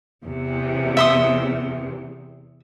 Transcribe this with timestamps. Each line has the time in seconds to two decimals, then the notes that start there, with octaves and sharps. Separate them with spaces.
0.24 E2 C3
0.97 E5 C6 D#6